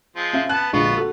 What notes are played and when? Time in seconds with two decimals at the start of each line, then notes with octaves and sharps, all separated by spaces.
0.16 F3 G#3 C4
0.33 C#4 E5 F5
0.49 B3 A5 F#6
0.73 A#1 D3 G#3 B3 F4 F#4
0.97 F#4 A4